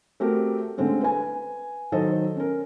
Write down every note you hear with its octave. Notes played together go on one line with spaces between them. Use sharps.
A3 C4 F#4 G4 A#4
D3 G#3 A3 C4 C#4
B4 G#5
D#3 F#3 A4 C5 D#5
C#4 A#4